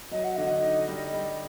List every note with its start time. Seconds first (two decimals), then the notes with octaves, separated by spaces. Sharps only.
0.11 F#3 D#5
0.24 F#5
0.36 D3 D#5
0.63 D#4
0.88 G3
1.13 G3